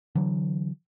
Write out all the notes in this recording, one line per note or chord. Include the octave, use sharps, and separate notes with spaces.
D3 E3 F#3